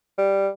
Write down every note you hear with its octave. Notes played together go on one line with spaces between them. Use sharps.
G3